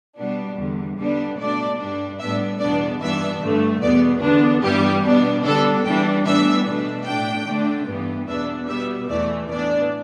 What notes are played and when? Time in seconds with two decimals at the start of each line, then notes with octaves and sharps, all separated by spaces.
0.17 B2 G3 B3 D4
0.57 E2 D3 G3
0.97 D3 G3 B3 D4
1.38 B2 A3 D4 D5
1.78 G2 G3 D4
2.19 A2 G3 B3 D4 E5
2.59 E2 B2 B3 D4 D5
3.00 G2 E3 B3 D4 E5
3.42 G2 D3 A3
3.82 E2 B2 B3 D5
4.22 E2 D3 B3 D4
4.63 G2 E3 G3 B3 G4
5.03 B2 B3 D4
5.45 D3 G3 B3 D4 A4
5.84 E2 E3 G3 D4 G5
6.25 A2 E3 G3 B3 D4 E5
6.66 B2 A3 D4
7.06 A2 A3 D4 G5
7.46 D3 A3 D4
7.87 G2 E3 B3
8.28 E2 B2 B3 D4 E5
8.68 B2 G3 B3 E5
9.09 E2 E3 A3 D5
9.50 A2 E3 B3 D4 D5